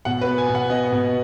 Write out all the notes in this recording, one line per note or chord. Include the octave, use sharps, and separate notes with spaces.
B2 F#5
B4
B3
G#5
B2
F#5
B3 D#5
B2